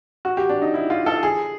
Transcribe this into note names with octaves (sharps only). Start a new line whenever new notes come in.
F#4
G4
D4
D#4
E4
F4
A4
G#4